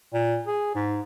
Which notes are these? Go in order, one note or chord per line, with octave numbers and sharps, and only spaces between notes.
A#2
G#4
G#2